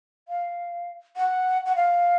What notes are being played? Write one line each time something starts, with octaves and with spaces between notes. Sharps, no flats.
F5
F#5
F#5
F5